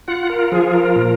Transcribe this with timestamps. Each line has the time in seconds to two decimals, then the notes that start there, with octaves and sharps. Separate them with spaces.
0.08 F4 F#5
0.30 A#4
0.52 F3 G#4
0.73 A#4
0.96 A#2